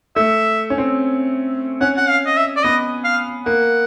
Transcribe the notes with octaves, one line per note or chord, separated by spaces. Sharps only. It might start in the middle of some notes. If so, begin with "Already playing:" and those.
A3 E5
C#4
C4
C#4 F#5
F#5
F5
D#5
E5
D5
B3 D#5
F5
A#3 F#5